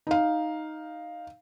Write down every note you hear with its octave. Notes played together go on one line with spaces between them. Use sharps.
D#4 F5